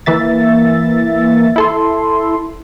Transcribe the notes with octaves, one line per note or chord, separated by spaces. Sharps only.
E3 A#3 E5 A6
E4 A4 C6